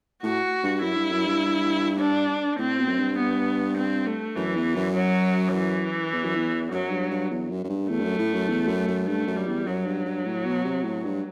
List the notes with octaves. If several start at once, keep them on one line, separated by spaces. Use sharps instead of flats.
A2 F#4
G2
F#2 E4
G2
F#2
G2
D4
A2 C4
B2
F#2
G2
B3
C4
A3
F#2 E3
E2
F#2
F#3
E3
E2
F#2
E2
F#2 F#3
G2
G2
E2
F#2
F#2
G2
E2 A3
G2
F#2
A2
F#2
E2
F#2
F#2
G2 A3
F#2
G3
E2
F#2 F#3
G2
G2
A2
B2
C3
A2
G2